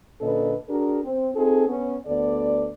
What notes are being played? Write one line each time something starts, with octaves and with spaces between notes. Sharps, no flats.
A#2 D3 C#4 A4 B4 D#5
D4 F#4 G#4 A#4
C4
C4 D#4 F4 G#4 A4
B3 C#4
D2 B3 A4 D5